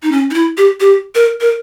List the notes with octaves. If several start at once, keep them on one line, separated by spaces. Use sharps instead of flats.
D#4
C#4
D#4
E4
G4
G4
A#4
A#4